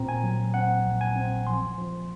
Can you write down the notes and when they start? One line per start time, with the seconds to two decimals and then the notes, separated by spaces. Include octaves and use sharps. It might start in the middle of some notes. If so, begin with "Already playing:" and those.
Already playing: A#2 C4 A#5
0.09 G#5
0.23 F#3
0.54 C4 F#5
0.85 A#1
1.01 G#5
1.16 C4
1.47 F3 C6
1.78 F3